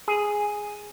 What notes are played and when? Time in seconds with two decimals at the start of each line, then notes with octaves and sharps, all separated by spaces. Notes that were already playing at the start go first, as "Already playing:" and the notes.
0.08 G#4